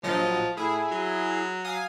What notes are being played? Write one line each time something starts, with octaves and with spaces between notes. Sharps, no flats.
A#1 F3 F#3 D#5
A2 E4 G#4
F#3
F5 G#5 D#6